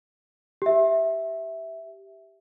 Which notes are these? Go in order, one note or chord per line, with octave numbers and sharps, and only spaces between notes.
G4 E5